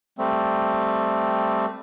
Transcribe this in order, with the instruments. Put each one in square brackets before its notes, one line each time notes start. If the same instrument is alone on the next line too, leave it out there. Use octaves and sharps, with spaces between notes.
[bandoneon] G3 A3 C4